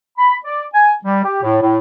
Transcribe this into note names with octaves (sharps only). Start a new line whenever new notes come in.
B5
D5
G#5
G3
G4
A2
A2